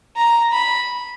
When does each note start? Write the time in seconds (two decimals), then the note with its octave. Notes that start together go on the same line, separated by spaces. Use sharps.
0.16 A#5
0.52 B5